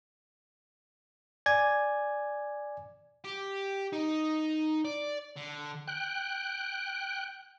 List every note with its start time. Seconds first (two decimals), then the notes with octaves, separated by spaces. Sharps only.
1.46 D5 G#5 G#6
3.24 G4
3.93 D#4
4.85 D5
5.37 D3
5.87 G5 F#6